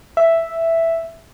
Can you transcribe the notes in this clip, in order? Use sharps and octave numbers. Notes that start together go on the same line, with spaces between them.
E5